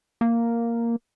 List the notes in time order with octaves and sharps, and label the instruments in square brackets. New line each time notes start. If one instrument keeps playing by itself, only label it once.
[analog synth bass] A#3